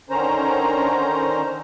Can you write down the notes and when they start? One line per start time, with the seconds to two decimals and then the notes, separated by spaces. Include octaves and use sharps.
0.10 D3 D#3 C#4 C5 A#5